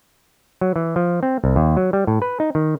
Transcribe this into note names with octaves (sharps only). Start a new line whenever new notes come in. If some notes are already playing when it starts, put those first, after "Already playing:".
F#3
E3
F3
C4
C2
D#2
F#3
G3
A2
B4
D#4
D#3